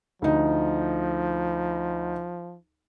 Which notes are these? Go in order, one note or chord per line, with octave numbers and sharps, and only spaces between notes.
D2 F3 D#4